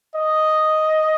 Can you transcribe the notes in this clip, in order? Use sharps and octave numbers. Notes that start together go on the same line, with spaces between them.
D#5